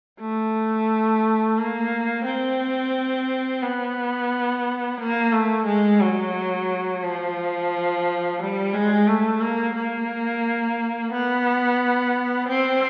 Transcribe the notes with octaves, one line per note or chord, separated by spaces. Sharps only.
A3
A#3
C4
B3
A#3
A3
G#3
F#3
F3
G3
G#3
A3
A#3
A#3
B3
C4